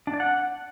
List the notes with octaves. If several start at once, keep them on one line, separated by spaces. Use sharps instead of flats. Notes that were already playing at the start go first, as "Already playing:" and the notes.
D4
D5
F#5